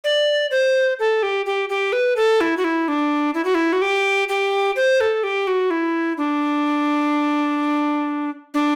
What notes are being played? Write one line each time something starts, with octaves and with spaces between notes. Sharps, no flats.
D5
C5
A4
G4
G4
G4
B4
A4
E4
F#4
E4
D4
E4
F#4
E4
F#4
G4
G4
C5
A4
G4
F#4
E4
D4
D4